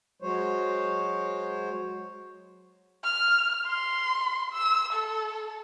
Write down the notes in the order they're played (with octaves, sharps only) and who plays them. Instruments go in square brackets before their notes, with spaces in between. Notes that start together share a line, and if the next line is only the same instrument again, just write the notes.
[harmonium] F#3 G#3 C5 C#5
[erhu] F6
C6
E6
A4